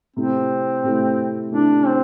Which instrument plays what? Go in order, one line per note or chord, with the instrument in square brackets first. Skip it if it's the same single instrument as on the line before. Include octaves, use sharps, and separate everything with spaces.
[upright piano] C3 A3 E4 [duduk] C4
[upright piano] C3 A3 E4
[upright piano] C3 A3 E4 [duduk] D4
[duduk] C4